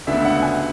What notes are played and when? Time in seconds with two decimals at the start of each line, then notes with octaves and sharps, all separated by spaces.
0.07 D2 C#3 G#3 B3 D4 E5
0.25 F#5
0.42 G#5